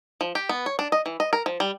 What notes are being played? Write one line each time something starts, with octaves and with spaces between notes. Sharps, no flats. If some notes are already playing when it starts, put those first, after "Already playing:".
F3
G4
B3
C#5
D4
D#5
E3
D#5
A#4
F3
G3